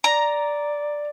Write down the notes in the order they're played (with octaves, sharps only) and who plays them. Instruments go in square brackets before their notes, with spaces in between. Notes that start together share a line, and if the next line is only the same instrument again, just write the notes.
[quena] D5 [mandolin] A#5